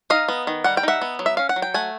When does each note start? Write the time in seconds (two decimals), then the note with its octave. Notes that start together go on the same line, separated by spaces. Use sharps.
0.10 D#4 D#5 F5
0.28 B3
0.47 D#3
0.64 G3 F#5
0.77 G5
0.83 D#4 E5 F#5
1.02 B3
1.19 F#3
1.26 E5
1.37 C#4 F5
1.49 F#5
1.56 F#3
1.62 G5
1.74 A3 F#5 G#5